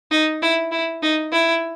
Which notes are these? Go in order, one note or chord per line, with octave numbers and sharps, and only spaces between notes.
D#4
E4
E4
D#4
E4